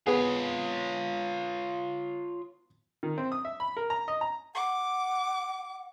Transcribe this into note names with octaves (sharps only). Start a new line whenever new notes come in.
B3 F4 G#4 C#5
D#3
C4
D#6
E5
B5
A#4
A#5
D#5
A#5
F#5 D6